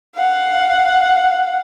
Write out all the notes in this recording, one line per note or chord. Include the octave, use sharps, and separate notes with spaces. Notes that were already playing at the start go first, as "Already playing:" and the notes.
F5 F#5